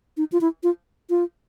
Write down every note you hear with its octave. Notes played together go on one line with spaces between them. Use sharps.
D#4
F4
E4
F4
F4